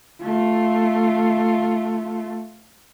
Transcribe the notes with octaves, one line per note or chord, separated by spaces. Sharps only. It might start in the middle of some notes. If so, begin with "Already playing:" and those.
A3 F4